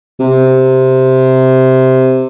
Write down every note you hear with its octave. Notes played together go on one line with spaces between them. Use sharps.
C3